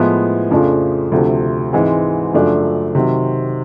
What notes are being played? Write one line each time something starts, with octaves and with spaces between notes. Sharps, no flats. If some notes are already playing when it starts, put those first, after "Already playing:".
Already playing: A2 F3 G#3 B3 E4
F2 C#3 F3 A3 D4
D2 C3 F3 A3
G#2 E3 G#3 C4
F#2 C#3 F3 A3 D4
C3 D#3 F#3